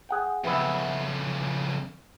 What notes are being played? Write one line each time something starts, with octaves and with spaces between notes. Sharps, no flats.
G#4 F#5 G5
F2 C#3 E3 B3 E4